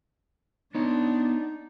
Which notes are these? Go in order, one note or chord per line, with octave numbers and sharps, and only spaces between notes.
B3 D4 D#4 C#5